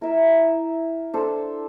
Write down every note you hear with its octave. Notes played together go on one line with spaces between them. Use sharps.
E4 A#4 E5
D4 A4 C5